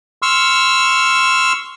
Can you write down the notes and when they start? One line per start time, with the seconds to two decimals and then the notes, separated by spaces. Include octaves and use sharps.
0.22 C6 C#6 E6 F6